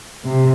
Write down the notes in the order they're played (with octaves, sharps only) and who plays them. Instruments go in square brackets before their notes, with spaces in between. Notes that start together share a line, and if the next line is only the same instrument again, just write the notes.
[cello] C3